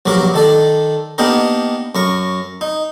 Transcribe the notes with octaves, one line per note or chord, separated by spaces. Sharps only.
A#1 G2 F#3 A#4 D6
D#3 A4 D5
A#3 B3 D4 D#4 G4 A#4
F#2 A#4 C#6
D#4